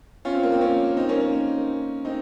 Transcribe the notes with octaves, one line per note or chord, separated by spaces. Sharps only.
C#4 F4
C4
A#3
C4
A#3 C#4
C4 D#4
A#3 C#4
A#3 C#4
C4 D#4